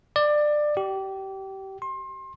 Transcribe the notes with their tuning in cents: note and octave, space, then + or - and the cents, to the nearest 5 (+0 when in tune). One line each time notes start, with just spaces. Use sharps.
D5 +20
G4 -25
C6 +30